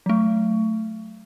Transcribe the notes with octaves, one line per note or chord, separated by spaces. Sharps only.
F#3 A3